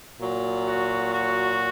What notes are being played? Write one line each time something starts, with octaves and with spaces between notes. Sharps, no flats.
A#2 F#3
F#4
F#4